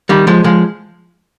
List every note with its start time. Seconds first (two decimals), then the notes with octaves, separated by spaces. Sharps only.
0.09 D#3 G3
0.27 F3 G#3
0.44 F3 G#3